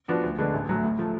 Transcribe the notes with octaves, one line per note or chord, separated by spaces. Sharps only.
F3 B3 D4 F#4
D2
D3 G#3 B3 D4
A1
A2 F#3 A3
A2
F3 A3